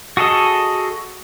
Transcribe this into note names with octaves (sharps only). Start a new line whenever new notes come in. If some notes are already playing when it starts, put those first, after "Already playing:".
F#4 G#4 A4 D#5